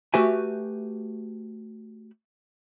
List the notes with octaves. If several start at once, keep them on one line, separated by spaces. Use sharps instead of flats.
A3 F#4 G4 B4 E5 G#5